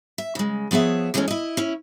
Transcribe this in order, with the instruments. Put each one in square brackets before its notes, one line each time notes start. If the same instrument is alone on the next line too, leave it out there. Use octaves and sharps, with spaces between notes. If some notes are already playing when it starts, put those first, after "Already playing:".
[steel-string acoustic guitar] E5
C#3 G#3
F3 B3 G#4 C#5 E5
E2 E3 G#3 A3 C4 C#4
E4 D#5
C#4 E4